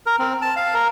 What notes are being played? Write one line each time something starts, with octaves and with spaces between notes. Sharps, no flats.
A#4
C4
A5
F5
A#4